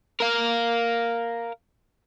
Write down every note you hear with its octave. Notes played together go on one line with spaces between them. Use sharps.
A#4 F5